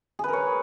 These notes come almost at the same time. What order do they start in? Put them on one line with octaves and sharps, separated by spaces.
G#4 B4 A#4 C#5